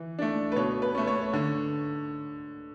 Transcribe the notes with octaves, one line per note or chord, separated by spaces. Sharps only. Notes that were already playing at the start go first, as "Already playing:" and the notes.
Already playing: E3
A3 D4
B4
B2 C#5
B4
A3 C#4
C#5
D3